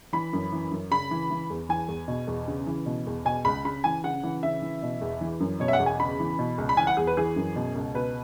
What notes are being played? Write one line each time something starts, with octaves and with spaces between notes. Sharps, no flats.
E3 B5
F#2
E3
F#2
C#3 B5
E3
E3
E2
E3 G#5
E2
B2
E2
C#3
E3
B2
E2
B2 G#5
C#2 B5
C#3 B5
E3 G#5
C#3 F#5
E3
C#3 E5
E3
B2
E2
E3
F#2
B2 C#5
E5
F#5
E2
G#5
C#3 B5
E3
B2
C#2
B5
E3 G#5
F#5
E2 G#4
B4
E3 G#4
F#2
B2
C#2
B2 B4